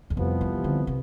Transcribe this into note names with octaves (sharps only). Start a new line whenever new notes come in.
E2
C2 F2 C3 F3 B3
E3
D3
C3